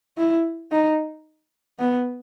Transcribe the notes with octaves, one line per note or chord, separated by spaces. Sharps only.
E4
D#4
B3